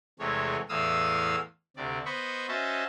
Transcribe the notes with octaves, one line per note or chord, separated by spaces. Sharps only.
E2 C3 G#3 A3 C#5
E2 A2 F5 D#6 E6
D2 C3 D5
B3 C5 D#5 B5 C#6
C#4 F#4 C5 D#5 E5 A5